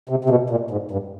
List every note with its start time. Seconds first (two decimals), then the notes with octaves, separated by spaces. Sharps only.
0.09 C3
0.25 C3
0.30 B2
0.50 A#2
0.71 G#2
0.91 G2